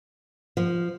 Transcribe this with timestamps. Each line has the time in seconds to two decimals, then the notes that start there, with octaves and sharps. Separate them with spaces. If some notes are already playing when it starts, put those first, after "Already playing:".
0.57 F3